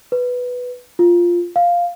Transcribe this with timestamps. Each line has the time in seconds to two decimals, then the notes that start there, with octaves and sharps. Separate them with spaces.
0.12 B4
0.99 F4
1.56 F5